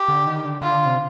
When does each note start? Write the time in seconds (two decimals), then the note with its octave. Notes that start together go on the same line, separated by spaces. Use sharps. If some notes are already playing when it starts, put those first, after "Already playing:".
Already playing: G4
0.08 D3
0.27 D#3
0.45 D3
0.62 D3 F4
0.86 C3